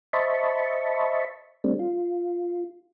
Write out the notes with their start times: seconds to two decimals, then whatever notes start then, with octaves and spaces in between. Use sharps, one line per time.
0.13 C5 D#5 E5 A5 B5 C#6
1.64 G3 A3 C4 D4
1.79 F4